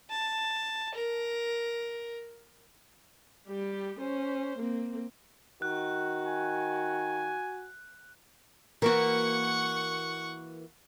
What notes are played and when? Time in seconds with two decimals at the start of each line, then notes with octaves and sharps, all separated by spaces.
0.10 A5
0.95 A#4
3.48 G3 G4
4.00 C#4 C5
4.59 A#3 C4
5.62 D#3 F#4 F#6
6.27 G#5
8.82 E3 A#3 F#4 A#4 F#5 C#6